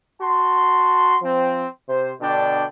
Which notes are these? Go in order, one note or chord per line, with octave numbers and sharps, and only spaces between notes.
F#4 A5 C6
F3 C4
C3 C5
B2 D3 D4 D5 G5